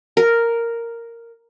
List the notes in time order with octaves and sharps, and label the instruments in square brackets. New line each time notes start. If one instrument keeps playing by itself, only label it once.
[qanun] A#4